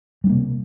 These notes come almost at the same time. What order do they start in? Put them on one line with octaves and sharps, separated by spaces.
G3 D4 A#3 C3